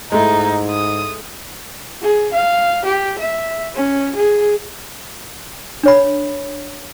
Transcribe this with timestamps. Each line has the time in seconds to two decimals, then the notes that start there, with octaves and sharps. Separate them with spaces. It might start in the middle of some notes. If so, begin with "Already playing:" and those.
0.12 G#2 G#3 A3 D#4 E4
0.70 D#6
2.02 G#4
2.33 F5
2.85 G4
3.19 E5
3.75 C#4
4.16 G#4
5.83 D4 C#5 B5